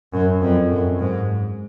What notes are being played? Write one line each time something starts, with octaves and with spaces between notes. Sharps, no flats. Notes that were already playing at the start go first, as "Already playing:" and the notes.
F#2
F2
F#2
G#2